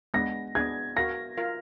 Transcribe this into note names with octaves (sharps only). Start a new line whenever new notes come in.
G#3 B3 D4 A#6
B3 D4 G#4 G#6
F#4 A#4 F5 A#6
F4 A#4 F5